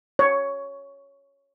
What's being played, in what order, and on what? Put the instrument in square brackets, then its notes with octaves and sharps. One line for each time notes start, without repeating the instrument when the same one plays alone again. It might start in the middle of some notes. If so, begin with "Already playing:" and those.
[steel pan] C#5